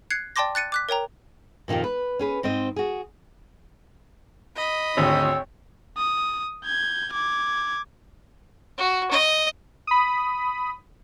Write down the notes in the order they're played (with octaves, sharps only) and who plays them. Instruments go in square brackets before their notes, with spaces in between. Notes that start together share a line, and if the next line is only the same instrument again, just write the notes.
[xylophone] F#6 G#6 C7 C#7
D5 G5 A5 C6 D6 A#6
F#6 A6 C#7 D#7
D6 F#6 B6
A#4 C#5 G5 A#5
[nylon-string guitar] F2 A#2 D#3 F4 G4
B4
C#4 G#4 B4
G#2 C4 C5 D#5
F#4 G#4
[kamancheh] D#5 B5
[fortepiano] G#1 D2 [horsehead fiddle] C#5 G5 [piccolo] E6
[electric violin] D#6
G6 G#6
D6 G#6
[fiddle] F#4
D#5
[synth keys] B5 D#6